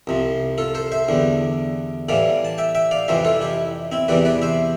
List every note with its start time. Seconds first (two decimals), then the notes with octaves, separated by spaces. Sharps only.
0.07 C2 C3 F3
0.58 F4 A4
0.75 A4 C5
0.92 C5 E5
1.08 E2 D3 G3
2.09 A2 E3 G3 D5 F5
2.45 A5
2.58 E5 G5
2.75 E5 G5
2.91 D5 F5
3.08 F2 C3 E3 G3 C5 E5
3.25 F4 A4
3.42 E4 G4
3.92 C4 E4
4.08 E2 C3 E3 G3 B4 D5
4.25 B4 D5
4.42 C5 E5